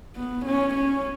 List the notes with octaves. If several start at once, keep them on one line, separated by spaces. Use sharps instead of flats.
B3
C#4
C#4